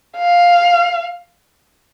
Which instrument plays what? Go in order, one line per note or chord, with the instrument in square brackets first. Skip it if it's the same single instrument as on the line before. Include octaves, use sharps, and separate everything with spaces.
[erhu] F5